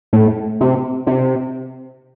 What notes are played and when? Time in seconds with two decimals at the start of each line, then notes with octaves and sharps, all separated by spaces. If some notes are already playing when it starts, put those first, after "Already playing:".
0.13 A2
0.60 C3
1.07 C3